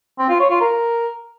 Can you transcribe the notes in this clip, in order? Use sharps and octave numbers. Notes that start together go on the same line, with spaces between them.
C4
F4
C#5
F4
A#4